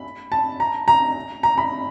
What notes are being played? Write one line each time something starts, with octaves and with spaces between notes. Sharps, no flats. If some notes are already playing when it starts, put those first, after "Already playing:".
Already playing: B5
A5
A#5
A#5
A#5
B5